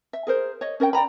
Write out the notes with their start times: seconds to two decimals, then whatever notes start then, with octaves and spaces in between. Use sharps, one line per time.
0.13 E5
0.27 G#4 A#4 C5
0.61 C#5 D#5
0.80 C#4 A#4 D#5 G5
0.93 D5 G5 A#5 B5